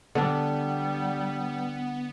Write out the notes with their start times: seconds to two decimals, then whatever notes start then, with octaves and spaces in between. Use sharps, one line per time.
0.15 D3 G3 B3 D4